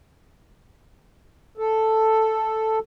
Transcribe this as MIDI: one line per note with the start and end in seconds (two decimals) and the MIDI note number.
1.57 2.79 69